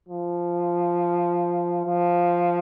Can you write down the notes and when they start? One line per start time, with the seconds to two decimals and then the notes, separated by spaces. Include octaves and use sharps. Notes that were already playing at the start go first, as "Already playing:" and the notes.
0.09 F3
1.86 F3